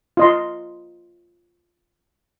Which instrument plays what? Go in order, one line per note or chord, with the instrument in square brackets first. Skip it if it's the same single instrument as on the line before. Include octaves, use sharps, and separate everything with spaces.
[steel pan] F4 D#5 C6